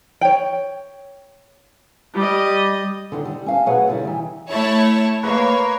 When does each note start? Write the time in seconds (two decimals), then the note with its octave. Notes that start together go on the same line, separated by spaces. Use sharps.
0.21 C#5 G5
2.15 G3 D#5
3.12 D3 D#3 D#5
3.25 G3
3.46 C#4 F5 A5
3.66 B2 F#3 G#4 B4 C#5 F#5
3.88 D3 G3 E4
4.05 D#3 E3
4.50 A3 E4 C#5 A5
5.23 A#3 B4 C#5